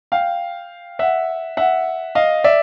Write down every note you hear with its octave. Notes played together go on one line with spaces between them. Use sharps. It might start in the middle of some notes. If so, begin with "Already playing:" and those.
F5 G5
E5 F#5
E5 F#5
D#5 F5
D5 E5